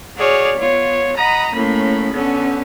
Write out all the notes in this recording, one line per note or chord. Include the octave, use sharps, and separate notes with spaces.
F#4 G#4 C#5 D5 F6
B3 F4 C#5
D#5 F#5 A#5 B5 D#6
A2 A#3 C#4 B5
D3 B3 C#4